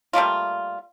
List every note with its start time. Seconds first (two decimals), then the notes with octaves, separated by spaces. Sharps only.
0.13 G3 A3 A#3 F4